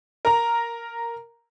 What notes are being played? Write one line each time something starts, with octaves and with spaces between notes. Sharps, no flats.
A#4 A#5